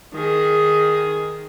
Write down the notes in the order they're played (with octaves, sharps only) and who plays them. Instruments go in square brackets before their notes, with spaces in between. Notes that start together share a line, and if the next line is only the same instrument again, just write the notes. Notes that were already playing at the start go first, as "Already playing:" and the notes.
[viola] D#3 G#4